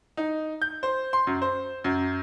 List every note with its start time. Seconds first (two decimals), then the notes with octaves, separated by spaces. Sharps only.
0.17 D#4
0.62 G6
0.83 C5
1.13 C6
1.27 F#2
1.42 C5
1.84 F#2